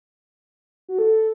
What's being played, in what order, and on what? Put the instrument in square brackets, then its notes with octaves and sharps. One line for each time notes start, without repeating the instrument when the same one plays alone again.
[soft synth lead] F#4
A4